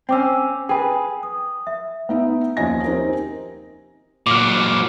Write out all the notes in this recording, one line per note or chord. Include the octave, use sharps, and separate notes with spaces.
C4 C#4 G5 D6 E6
G#4 B4 G5
D#6
E5
B3 D#4 E5
D#2 F3 C#4 D#5 G#5 A#6
C4 D#4 G4 A#4 G#5
A#2 F#3 D6 F6